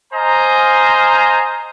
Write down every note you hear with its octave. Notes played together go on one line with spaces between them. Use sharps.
C5 D#5 F5 G#5 A#5